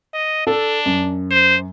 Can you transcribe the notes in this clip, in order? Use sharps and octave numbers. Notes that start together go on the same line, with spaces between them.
D#5
D4 A4
F#2
C5